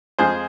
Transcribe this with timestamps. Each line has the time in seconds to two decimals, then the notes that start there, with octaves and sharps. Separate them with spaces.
0.19 F2 F3 G#3 G#4 C5